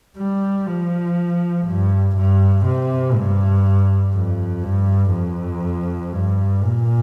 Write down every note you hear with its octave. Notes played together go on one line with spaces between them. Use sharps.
G3
F3
G2
G2
C3
G2
F2
G2
F2
G2
A#2